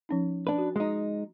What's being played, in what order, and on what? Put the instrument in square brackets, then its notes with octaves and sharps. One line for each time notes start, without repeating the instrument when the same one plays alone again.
[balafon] F3 C#4 D#4
[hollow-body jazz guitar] D4 B4
[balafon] F#4
[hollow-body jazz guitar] G#3 D#4